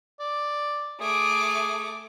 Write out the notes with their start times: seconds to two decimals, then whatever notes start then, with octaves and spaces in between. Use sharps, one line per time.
0.20 D5
1.01 A3 G#4 D6